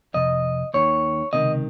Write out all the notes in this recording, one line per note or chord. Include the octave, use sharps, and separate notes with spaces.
F2 C3 D#5
D#2 D#3 C#5
C#2 C3 D#3 D#5